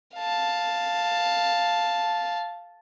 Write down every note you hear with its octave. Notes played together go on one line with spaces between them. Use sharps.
F5 A5